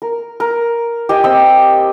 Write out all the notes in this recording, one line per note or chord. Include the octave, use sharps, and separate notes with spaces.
A#4
A#4
G4 D#5 G5 G#5
C4 D#5 G5 E6